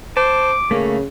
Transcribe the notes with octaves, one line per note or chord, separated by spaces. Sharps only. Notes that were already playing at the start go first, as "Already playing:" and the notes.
C5 A5 D6
C#3 A3 A#3 C#4